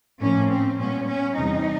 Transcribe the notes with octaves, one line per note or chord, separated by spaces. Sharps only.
A2 F3 A#3 C#4
C4
A#2 G3 B3 C#4
C#4
E2 C3 E3 G3 C4 D#4